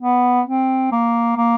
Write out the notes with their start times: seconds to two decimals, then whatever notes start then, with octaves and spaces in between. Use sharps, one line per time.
0.01 B3
0.47 C4
0.92 A#3
1.37 A#3